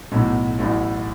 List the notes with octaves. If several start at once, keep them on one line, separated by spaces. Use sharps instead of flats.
B1 A2 F#3 A3
A1 A2 F#3 A3 E4